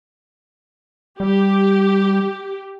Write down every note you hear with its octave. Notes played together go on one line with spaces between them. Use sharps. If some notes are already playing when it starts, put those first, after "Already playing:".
G3 G4